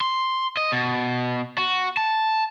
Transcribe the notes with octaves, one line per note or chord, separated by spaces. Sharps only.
C6
D#5
B2
F#4
A5